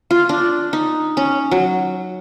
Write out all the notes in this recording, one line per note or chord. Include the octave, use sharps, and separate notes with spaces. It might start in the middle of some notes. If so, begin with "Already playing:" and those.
F4
D4
D#4
C#4
F#3